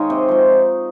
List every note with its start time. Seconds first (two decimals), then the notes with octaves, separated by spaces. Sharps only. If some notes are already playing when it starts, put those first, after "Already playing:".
Already playing: D#3 G#3 D#4 C#5 D#5 F5
0.10 C3
0.29 F3 G#3